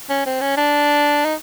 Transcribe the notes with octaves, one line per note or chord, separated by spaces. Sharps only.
C#4
C4
C#4
D4
D#4